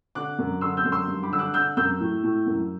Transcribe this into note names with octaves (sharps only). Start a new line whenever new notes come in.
D3 D6 F#6
F#2
D3 C6 E6
E6 G6
F#2
C6 E6
G2
B5 D6
D3 E6
D6 F#6
D3 E6 G6
F#2 E6 G6
A2
A2
F#2